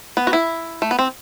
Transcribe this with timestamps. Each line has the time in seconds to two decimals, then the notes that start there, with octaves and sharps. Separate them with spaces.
0.17 B3
0.27 F#4
0.33 E4
0.82 A3
0.91 B3
0.99 C4